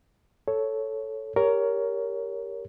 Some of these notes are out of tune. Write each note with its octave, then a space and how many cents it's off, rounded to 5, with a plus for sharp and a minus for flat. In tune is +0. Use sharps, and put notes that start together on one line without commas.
A4 +0 C#5 +0
G4 +15 A#4 +0 C#5 +20